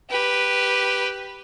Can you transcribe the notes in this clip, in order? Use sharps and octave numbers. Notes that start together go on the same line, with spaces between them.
G4 B4